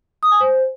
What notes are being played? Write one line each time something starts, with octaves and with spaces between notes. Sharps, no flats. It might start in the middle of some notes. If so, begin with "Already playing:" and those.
D#6
G#5
C5